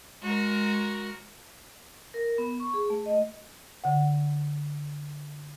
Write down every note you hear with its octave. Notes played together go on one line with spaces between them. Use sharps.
G#3 F#4 A#4
A#4
B3
C#6
G#4
A3
D#5
D3 F#5